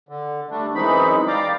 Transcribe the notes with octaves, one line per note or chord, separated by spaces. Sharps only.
D3
G3 A3 D4
F#2 E3 G#3 C4 D#4 B5
D5 F5 G5 A#5 D6